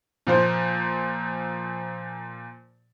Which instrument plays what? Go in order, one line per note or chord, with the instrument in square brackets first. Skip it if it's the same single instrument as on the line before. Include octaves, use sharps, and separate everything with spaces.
[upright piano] A#2 F3 C5